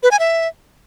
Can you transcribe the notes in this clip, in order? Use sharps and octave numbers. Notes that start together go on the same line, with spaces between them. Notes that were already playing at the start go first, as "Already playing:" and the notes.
B4
G#5
E5